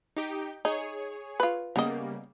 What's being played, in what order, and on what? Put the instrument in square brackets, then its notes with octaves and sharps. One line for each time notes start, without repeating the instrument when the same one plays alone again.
[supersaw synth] D#4 G4 G5
[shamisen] D#4 [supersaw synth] G#4 C#5
[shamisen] F4 B4
[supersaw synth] C#3 G3 A#3 [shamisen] B3 D#5